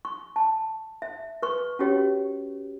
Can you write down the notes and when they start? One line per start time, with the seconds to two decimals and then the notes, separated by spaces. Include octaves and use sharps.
0.05 C#6
0.36 A5
1.02 E5
1.42 B4 C#6
1.79 C#4 F#4 G4 C#5